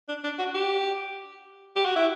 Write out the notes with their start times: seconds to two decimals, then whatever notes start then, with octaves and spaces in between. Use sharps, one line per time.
0.08 D4
0.24 D4
0.39 F#4
0.54 G4
1.76 G4
1.85 F#4
1.96 E4